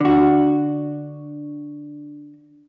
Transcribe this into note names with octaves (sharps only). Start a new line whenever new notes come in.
D3 F#4